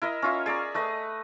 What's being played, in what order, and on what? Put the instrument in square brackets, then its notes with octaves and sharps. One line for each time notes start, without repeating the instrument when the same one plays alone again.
[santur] E4 A#4 D#5
C#4 F4 E5
G#4 D5 E5 A#5
A3 B4 D#5